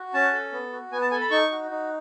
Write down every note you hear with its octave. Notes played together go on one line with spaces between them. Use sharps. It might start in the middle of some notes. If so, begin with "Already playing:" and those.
Already playing: F#4
C#4 A5
A4
B3
F#4
B3 G#5
A5
A4 G#5
B5
D#4 C#6
F#4
D#4